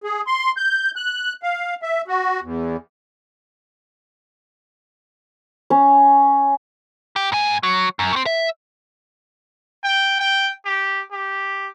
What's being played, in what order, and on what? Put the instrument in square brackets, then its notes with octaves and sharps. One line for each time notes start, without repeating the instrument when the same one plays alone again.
[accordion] G#4
C6
G6
F#6
F5
E5
F#4
E2
[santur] C#4 C#5
[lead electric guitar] G4
G#2 G#5
F#3
F#2
A3 C4
E5
[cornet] G5
G5
G4
G4